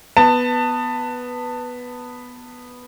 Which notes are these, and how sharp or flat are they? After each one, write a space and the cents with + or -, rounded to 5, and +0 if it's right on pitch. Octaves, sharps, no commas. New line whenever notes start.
B3 +0 A5 +20